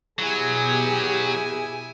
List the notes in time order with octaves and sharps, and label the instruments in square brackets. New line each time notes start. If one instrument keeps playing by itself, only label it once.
[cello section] B2 G4 [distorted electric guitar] F#3 [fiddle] E4 G#5 [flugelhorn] G#4